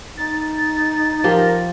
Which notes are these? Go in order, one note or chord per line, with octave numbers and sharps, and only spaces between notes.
D#4 A6
F3 G4 A#4